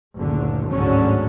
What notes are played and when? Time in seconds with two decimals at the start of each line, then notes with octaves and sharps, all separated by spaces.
0.18 F#1 D2 A#2 D3
0.71 G#1 D2 A2 D3 F#3 C#4